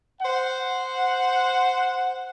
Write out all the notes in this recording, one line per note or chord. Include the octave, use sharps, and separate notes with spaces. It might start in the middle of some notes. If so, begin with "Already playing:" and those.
C5 F#5